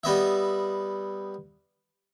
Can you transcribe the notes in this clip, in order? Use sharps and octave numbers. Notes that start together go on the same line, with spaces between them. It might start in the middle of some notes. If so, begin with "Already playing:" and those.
G3 B3 D#5 E5